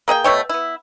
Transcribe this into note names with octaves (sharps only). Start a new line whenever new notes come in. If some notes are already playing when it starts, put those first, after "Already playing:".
A#3 G#4 D#5 G5
B2 A3 C#5 G5
B3 E4